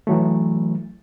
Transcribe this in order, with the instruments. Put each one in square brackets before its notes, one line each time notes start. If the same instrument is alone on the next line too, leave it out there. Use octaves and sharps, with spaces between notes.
[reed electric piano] E3 F#3 A3